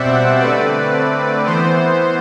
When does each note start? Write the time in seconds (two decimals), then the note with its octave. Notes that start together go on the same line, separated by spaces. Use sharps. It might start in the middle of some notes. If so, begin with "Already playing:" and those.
Already playing: B2 G3 C4 C5 D5 E5 F#5
0.40 D3 A3 C4 B4 D5
1.45 E3 B3 C5